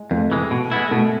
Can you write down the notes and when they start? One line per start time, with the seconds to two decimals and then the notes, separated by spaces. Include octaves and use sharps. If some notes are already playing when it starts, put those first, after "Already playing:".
Already playing: G#3
0.11 F2 A3
0.32 C3 E3 G#3
0.51 B2
0.72 G#3 B3 E4
0.91 B2 A3